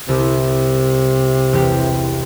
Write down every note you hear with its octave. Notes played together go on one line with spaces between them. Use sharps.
C2 C3
E1 G4